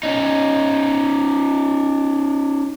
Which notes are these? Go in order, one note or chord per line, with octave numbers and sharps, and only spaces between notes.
C#4 D#4